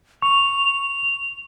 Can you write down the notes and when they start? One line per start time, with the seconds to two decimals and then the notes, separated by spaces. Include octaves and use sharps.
0.22 C#6 F7